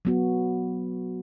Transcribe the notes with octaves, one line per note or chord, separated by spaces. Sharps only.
F#3 B3 F#4